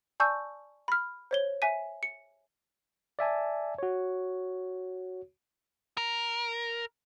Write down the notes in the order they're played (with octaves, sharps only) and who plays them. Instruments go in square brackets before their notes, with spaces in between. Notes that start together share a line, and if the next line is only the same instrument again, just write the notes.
[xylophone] D5 G#5 A5 C#6 E6 G6
B5 F6
C5 C#5 G7
E5 G#5 B6 D#7
C#7
[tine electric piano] D5 E5 G#5 A5
F#4 C#5
[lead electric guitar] A#4